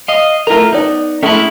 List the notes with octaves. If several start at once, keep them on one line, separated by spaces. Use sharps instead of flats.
D#5 F5
A3 E4 F4 A#4 A#5
B3 D#4 D5
G#3 A3 C#4 E4